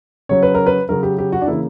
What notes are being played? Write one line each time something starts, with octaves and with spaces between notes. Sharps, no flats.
C#3 F#3 C#4 C#5
B4
A#4
B4
C#3 F#3 C#4 A#4
G4
G4
F#4
D4
C#3 E3 A#3 E4